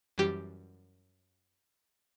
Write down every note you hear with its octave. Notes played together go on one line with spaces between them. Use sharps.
F#2 E3 G3 G4